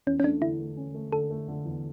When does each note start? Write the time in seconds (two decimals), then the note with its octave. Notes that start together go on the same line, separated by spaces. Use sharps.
0.07 E2 C#4
0.20 C#4
0.24 A3 D4
0.41 D3 E4
0.59 A3
0.77 C#4
0.94 A3
1.12 D3 A4
1.30 A3
1.48 D3
1.65 E2